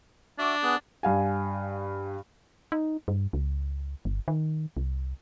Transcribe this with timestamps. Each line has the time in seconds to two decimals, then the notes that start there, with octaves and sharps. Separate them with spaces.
0.39 D4 F#4 E5 D6
0.63 B3 G#4 F#6
1.03 G2 F5 G#5
2.72 D#4
3.08 G2
3.33 C#2
4.05 G1
4.28 D#3
4.77 C2